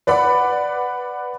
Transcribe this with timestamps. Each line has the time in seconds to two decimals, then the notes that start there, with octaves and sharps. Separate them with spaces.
0.07 B4 D5 F#5 B5